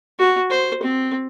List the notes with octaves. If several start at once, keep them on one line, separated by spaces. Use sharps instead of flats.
F#4
C5
C4